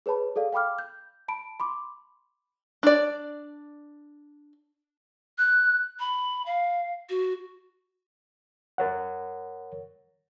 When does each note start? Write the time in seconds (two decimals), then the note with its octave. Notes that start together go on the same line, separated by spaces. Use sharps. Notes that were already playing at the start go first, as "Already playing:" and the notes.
0.06 G#4 B4 C#5 A5 B5
0.36 G#4 A4 D5 F5
0.53 F5 G5 B5 D6 F6
0.79 G6
1.28 A5 B5 D7
1.60 B5 C6 D6
2.83 D4 D5
5.38 F#6
6.00 B5
6.46 F5
7.09 F#4
8.78 A#4 C#5 F#5